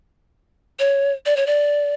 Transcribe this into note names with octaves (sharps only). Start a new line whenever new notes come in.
C#5
D5
C#5
D5